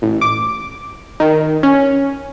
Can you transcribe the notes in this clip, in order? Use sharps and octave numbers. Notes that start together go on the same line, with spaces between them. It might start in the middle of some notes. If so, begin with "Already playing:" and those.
A1
D6
D#3
C#4